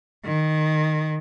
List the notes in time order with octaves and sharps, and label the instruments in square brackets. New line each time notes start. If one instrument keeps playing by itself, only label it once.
[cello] D#3